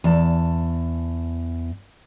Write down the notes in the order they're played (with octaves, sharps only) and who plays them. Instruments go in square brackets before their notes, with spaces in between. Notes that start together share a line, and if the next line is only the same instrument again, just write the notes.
[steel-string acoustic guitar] E2 A5